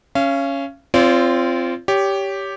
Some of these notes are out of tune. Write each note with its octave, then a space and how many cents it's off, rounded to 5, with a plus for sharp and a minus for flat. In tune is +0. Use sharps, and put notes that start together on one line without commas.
C#4 +0 F5 -35
C4 +0 F4 -20 D5 -45
G4 +0 C#5 +25